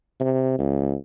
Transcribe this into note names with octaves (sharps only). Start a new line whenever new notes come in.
C3
C#2